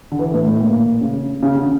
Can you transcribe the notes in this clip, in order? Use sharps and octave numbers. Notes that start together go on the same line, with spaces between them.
D3
E3
A2
A2
A#2
C#3
C#3
D3